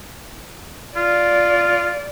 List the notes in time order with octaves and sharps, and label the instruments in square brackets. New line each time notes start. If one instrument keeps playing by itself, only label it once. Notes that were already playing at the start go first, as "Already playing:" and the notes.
[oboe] F4 [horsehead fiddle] D5